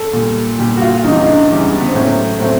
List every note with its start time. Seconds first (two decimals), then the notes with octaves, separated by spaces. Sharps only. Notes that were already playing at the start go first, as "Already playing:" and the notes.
Already playing: A4
0.13 A#2 G3
0.59 A#2 G3 G4
0.77 F#4
0.81 F4
1.04 E2 C#3 E3 G3 D#4
1.19 D#4
1.27 D4
1.50 E2 C#3 E3 G3
1.80 B3
1.87 C4
1.94 A2 F#3 A3 C#4
2.39 A2 F#3 A3 C4